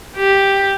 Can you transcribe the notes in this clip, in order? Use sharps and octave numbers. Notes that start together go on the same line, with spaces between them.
G4